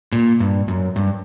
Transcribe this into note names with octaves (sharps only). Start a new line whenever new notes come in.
A#2
G2
F#2
G2